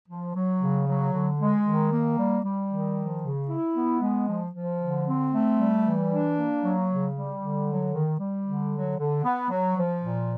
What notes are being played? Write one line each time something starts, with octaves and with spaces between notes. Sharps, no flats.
F3
F#3
C#3
F#3
D3
G#3
D#3
A#3
G3
G3
D#3
F3
C#3
E4
B3
G#3
F3
F3
D3
C4
A3
G3
E3
D4
A#3
F#3
C#3
G3
D3
F#3
D#3
G3
D3
F#3
D3
B3
F#3
F3
A#2